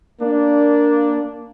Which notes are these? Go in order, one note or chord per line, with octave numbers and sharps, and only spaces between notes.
A#3 D4